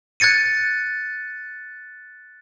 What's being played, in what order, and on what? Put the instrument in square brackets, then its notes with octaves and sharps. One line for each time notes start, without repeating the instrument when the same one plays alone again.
[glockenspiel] F#6 G#6 A6 C#7 D#7